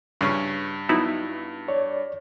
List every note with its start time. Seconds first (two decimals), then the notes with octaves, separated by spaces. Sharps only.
0.21 G2 C#3 C#4
0.89 F#3 B3 D#4 E4
1.68 C#5 D5